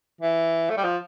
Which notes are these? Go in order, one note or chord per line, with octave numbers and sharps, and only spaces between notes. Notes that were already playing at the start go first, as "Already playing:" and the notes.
E3
A3
G3
F3